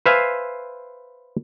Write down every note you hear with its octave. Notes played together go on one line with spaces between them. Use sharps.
B4 C5 E5 F5 G#5